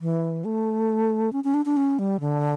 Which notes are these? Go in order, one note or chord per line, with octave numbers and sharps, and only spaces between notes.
E3
A3
C#4
C#4
D4
D4
C#4
G3
D3